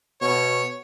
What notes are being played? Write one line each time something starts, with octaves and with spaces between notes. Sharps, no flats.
B2 C#5